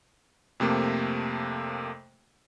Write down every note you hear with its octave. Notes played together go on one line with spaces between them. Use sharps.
F2 C3 A3 A#3